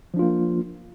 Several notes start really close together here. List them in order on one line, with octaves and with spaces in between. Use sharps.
F3 D4 F4 A#3